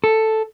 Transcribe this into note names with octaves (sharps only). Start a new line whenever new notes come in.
A4